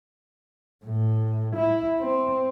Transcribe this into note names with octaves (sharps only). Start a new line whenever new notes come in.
A2
E4
C4